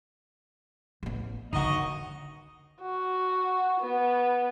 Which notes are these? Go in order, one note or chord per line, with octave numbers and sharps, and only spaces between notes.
A1 B3
D3 D#3 D#4 F#4 D#5
F#4
B3